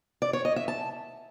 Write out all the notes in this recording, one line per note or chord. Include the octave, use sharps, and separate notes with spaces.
D5
C#5
D#5
E5
A5